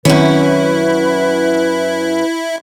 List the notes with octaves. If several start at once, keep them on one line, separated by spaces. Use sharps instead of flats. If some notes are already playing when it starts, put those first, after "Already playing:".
F#2 D#3 C4 C#4 E4 B4